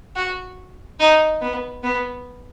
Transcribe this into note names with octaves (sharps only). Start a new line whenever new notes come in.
F#4
D#4
B3
B3